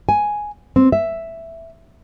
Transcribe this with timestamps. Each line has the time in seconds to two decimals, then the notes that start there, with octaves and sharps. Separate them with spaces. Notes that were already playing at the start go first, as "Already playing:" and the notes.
0.09 G#5
0.76 C4
0.92 E5